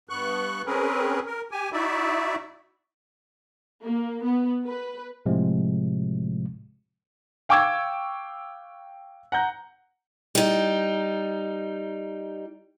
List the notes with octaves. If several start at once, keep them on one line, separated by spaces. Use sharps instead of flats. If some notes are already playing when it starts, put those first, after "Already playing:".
G2 B3 C#6 F#6
C4 C#4 G#4 A#4 B4
A#4
G4 G#5
D#4 E4 F#4 D5 E5
A#3
B3
B4
A2 C3 F3 G#3
F5 G5 C#6 D6 E6 G#6
F#5 A#5 G6
G3 D#4